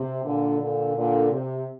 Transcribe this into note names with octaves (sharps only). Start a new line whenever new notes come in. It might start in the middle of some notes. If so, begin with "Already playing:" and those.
Already playing: C3
A#2 D3
A#2 D3
A#2 D3
C3